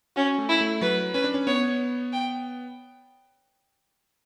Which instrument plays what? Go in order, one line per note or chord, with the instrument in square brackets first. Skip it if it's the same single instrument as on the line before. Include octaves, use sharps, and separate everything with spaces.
[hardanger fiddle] C#4 [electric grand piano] F#4
[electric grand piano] A3
[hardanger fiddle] E4
[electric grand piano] A3
[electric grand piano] F#3 [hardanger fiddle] B4
[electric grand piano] C#4 [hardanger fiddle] B4
[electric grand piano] D4
C#4
[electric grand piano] B3 [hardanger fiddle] C#5
[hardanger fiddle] G5